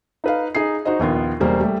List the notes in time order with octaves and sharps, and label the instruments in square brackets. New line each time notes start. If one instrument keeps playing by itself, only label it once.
[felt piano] D#4 B4 F5
D#4 G#4 C7
D#4 F#4 C5 D#5
A#1 D#2 B3 F4
E1 G3 A#3 C5
G3 A3